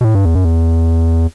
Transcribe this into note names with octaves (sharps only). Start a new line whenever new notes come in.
B2
A2
G2
E2
F#2
E2